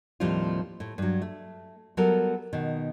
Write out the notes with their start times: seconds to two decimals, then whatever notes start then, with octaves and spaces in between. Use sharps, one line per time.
0.20 D#2 A2 F3 G3 C4 F4
0.80 A2
0.98 G2 F#3
1.22 A3
1.97 F#3 G3 B3 A4 A#4
2.53 B2 D#3